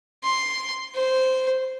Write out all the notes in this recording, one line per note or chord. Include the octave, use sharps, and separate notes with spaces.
C6
C5